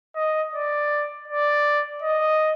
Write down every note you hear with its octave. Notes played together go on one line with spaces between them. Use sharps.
D#5
D5
D5
D#5